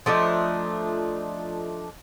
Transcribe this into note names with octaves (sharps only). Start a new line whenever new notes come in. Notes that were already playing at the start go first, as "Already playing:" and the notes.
F3 A3 D4 D#4